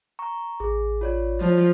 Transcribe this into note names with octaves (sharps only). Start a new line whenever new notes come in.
A#5 C#6
A1 G#4
F4 C#5 D5
F3